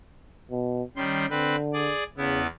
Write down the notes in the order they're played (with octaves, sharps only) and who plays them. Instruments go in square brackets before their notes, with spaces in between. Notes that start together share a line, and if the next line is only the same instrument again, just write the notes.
[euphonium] B2
[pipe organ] D#3 G3 C6 [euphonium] C#4
[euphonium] D3 [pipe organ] C4 B4
[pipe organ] G#4 D5
[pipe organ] E2 B3 E4 [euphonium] C#3